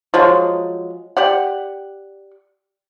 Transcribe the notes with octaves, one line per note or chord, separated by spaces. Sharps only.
F3 F#3 G#3
G4 D5 F#5